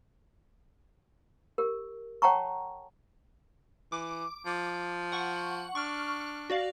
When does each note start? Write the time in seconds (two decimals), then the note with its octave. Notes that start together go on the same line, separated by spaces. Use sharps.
1.58 G4 A#4
2.22 C#5 F#5 G5 A5 A#5 C#6
3.92 E3 D6
4.46 F3
5.12 F#5 C#6
5.75 D4 C#6 F6
6.50 F#4 D5 F5